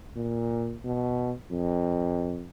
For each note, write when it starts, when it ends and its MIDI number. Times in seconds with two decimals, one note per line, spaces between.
0.16 0.77 46
0.85 1.33 47
1.51 2.50 41